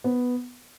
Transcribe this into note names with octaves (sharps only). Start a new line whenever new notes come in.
B3